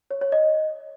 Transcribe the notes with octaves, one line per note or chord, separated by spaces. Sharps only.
C#5
C#5
D#5